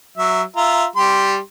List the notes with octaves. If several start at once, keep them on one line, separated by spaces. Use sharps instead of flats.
F#3 E5
F4 E5 A#5
G3 G4 C6